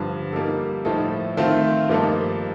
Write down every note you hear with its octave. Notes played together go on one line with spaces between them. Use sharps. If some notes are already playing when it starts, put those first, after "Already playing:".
Already playing: G2 D3 F3
G3 A#3 D#4 A4
A2 F3 A3 D#4 A4
D#3 A3 C4 F4
G2 F3 A#3 D#4 A4